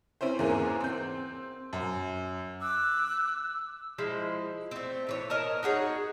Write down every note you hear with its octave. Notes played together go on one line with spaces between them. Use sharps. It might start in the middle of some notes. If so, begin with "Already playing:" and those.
C4 C#4 E4 C5
E2 G#2 A#3 G#4
C4 G6
F#2
D6 E6 F#6
F3 G#3 E4
A3 C4
A2 E3 C#5
A#4 C#5 D#5 A5
D#4 F#4 G#4 C#5